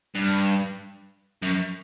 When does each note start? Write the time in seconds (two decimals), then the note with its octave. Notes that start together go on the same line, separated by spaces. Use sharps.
0.15 G2
1.42 F#2